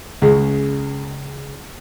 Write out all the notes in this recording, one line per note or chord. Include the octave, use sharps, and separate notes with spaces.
C#2 C#3 G#3